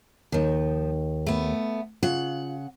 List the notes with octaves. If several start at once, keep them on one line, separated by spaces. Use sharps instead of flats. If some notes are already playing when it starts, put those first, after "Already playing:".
D#2 D#3 F3 D#4
A3 B3
C#3 F4 F#5